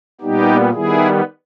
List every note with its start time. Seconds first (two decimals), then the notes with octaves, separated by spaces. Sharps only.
0.21 A#2 G3 B3 D#4 G4
0.72 D#3 G3 B3 E4 G#4